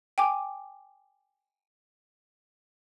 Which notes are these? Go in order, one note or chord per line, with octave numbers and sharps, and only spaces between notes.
G5 G#5 D6